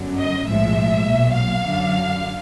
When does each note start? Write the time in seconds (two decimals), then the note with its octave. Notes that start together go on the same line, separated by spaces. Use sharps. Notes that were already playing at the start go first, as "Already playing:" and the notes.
Already playing: G1 F#2 D3 F#3
0.19 D#5
0.48 B1 A2 F3 G#3 E5
1.06 B1 A#2 F#3
1.35 F5
1.64 F#2 D3 F#3